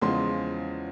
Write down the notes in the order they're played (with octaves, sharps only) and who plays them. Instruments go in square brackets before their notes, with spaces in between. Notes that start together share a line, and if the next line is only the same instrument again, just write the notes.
[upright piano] E2 C#3 F3 G#3 C6